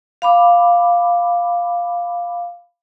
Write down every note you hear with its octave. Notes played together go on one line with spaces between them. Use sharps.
F5 B5 D6